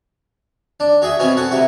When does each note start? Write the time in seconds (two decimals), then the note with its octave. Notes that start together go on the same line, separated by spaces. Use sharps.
0.80 D4
1.02 F#4 G#4 E5
1.19 B2 C4 C#4 E4 G#5
1.37 F#4 A4 F#5
1.51 C3 E4 F#4